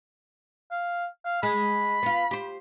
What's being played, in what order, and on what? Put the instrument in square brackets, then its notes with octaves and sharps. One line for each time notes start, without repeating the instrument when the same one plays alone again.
[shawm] F5
F5
[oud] G#3 G#4 [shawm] B5
[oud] B3 F4
G4 C5